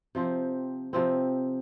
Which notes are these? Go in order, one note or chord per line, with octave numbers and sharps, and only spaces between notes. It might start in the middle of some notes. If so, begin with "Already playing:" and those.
C3 F3 C4
C3 F3 C4